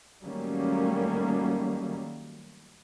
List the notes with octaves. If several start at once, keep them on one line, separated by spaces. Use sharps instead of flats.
D#3 F#3 G3 A3 A#3 C#4